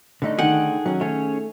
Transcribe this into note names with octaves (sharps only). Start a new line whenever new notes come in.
D3 A3 D#4
D#3 G#4 A4 F#5 G5
F#3 C#4
A3 C#4 G#4 C#5